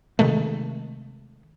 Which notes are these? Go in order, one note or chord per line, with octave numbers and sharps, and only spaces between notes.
C3 D#3 G#3 A3